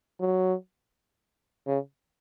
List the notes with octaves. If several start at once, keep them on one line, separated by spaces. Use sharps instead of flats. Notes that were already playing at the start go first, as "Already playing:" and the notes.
F#3
C#3